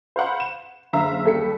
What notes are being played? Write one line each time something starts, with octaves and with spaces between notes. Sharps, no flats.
C5 F5 F#5 B5
E7
F#1 D3 E5 F5 A#5 E6
D#2 G3 A4 B6 C#7